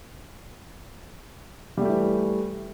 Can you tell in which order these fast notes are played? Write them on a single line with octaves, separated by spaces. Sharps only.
G3 A3 G4 E3